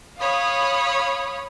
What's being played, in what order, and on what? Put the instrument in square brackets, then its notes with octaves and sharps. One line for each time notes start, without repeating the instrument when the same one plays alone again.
[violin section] C#5 F5 B5 D#6